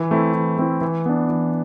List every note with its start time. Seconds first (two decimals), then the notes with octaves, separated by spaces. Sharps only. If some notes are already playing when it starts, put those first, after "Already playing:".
Already playing: E3
0.11 A3 C4 E4
0.34 E3
0.58 A3 C4 E4
0.81 E3
1.06 B3 D4
1.29 E3